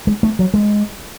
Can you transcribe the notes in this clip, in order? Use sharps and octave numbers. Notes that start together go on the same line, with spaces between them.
G#3
A3
F#3
G#3